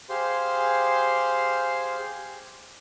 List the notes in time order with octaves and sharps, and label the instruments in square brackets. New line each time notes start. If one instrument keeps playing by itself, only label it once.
[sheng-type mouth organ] G4 G#4 C5 F5 C6